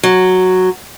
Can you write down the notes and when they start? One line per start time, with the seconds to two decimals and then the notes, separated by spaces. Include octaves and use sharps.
0.03 F#3